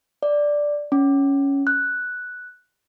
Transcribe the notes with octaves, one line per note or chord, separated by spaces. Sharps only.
D5
C#4
F#6